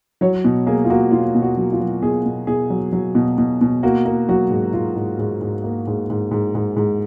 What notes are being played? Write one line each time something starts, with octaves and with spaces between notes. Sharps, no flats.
F#3 C#5
B2
A#3 G#4
F4
A#3 F#4
B2 F4
B2
F#4
F#3
F4
F#3
B2 G#4
B2
B2 G#4
F#3
F#3
B2
B2
B2
A#3 F#4
A#3
F#3 F#4
G#2
G#2 F4
G#2
G#2
G#2
A#3
G#2
G#2
G#2
G#2
G#2